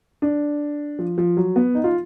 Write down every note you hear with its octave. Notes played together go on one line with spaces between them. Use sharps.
D4
F3
F3
F#3
B3
D#4
F4